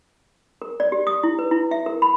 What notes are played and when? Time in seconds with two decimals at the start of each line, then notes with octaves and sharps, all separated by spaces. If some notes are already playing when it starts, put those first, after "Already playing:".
0.62 A#4
0.80 D5
0.92 G4
1.07 D#6
1.23 E4
1.39 B4
1.51 E4
1.71 E5
1.86 A#4
2.02 B5